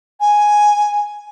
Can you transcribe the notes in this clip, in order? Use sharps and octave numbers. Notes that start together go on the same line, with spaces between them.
G#5